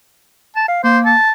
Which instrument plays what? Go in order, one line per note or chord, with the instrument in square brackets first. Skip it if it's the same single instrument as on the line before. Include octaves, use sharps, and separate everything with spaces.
[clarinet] A5
F5
[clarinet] A#3 [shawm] C5
[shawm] A5